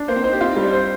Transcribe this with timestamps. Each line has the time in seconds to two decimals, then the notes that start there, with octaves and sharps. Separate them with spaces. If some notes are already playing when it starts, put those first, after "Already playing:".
Already playing: D4
0.08 A#3 C5
0.16 C4
0.24 D#4 C5
0.33 G4
0.41 C4 F4
0.51 D#4
0.56 G3
0.62 D4
0.72 C5